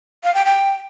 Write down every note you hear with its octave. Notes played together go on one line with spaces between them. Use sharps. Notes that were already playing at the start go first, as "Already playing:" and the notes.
F5
G5
G5